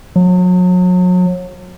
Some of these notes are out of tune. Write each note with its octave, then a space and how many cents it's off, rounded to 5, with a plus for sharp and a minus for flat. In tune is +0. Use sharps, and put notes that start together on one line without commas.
F#3 -35